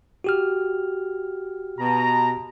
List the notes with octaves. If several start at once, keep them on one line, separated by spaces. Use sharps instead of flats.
F#4 G4 F6
B2 A#5